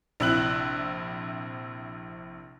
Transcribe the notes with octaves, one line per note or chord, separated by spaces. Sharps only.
A#1 C3 E4 E6 F#6 F#7